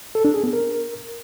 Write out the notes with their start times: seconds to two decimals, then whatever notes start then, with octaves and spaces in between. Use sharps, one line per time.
0.15 A4
0.25 D4
0.34 G#4
0.44 B3
0.53 A#4